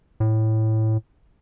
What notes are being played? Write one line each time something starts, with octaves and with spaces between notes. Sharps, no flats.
A2